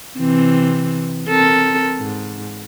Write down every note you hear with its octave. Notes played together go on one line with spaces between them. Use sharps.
C3 E3 C4
C4 A4 A#4
G#2